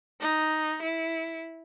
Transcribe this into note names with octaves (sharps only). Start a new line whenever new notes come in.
D#4
E4